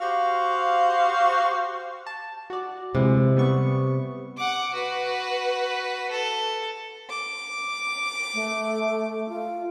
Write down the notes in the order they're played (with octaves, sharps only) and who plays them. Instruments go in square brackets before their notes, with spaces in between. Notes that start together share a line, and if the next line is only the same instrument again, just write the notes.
[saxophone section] F#4 G4 C5 F5
[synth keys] A5
F#4 D5
[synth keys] D2 E3 G#3 [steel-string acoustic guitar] C3
[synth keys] G3 B3 C#6
[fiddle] F#5 D6
F#4 B4
A4
[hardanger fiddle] D6
[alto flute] A3
F4